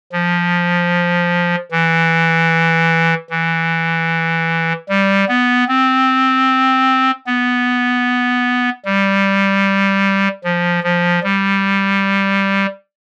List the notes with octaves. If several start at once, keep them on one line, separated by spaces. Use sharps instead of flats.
F3
E3
E3
G3
B3
C4
B3
G3
F3
F3
G3